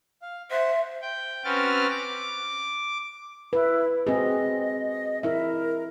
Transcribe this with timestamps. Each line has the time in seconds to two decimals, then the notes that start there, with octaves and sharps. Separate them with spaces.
0.22 F5
0.51 C5 E5 F#5
1.02 G5
1.44 C4 C#4 F#4 B4 F6 A6
1.90 D6
3.53 E4 B4
4.07 C4 F#4 G#4 D#5
5.23 E4 A#4 E5